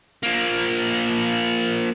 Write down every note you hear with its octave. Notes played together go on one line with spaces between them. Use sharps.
F3 A#3